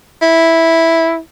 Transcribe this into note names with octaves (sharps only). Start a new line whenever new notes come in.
E4